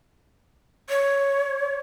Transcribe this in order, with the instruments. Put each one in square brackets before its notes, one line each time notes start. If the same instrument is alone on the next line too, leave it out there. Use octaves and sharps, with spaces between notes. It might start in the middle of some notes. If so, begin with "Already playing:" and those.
[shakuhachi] C#5